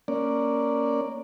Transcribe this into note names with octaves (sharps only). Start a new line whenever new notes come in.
A#3 C#4 D5